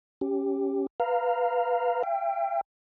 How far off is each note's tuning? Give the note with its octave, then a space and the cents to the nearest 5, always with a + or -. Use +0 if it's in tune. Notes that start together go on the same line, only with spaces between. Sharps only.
C#4 +0 G4 +0
B4 +0 F5 +0 A#5 -10
E5 +45 G5 +15